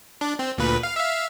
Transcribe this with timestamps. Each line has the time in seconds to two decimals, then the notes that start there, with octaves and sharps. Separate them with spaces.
0.21 D4
0.39 C4
0.58 D2 A#2 B4
0.83 F5
0.96 E5 F5